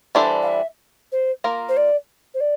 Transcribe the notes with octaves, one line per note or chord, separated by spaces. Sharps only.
E3 G3 D4 A4 C5
F5
E5
C5
A#3 F4 A#4
C5
D5
C5
D5